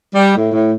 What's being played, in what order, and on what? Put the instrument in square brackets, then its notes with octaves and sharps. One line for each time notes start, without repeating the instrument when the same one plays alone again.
[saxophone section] G3
A2
A2